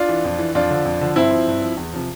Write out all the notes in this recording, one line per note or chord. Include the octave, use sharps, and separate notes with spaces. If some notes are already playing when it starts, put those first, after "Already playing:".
Already playing: D4 F4
E3
F2
E3
F2 D4 F4
D3 F3
F2
D3 F3
G2 C4 E4
F3
G2
F3
E2
C3 F3